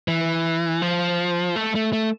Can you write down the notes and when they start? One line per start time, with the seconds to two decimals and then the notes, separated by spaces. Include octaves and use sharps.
0.08 E3
0.82 F3
1.56 A3
1.75 A3
1.93 A3